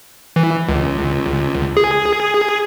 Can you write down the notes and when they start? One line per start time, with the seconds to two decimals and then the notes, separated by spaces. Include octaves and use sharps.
0.36 E3
0.69 C#2
1.77 G#4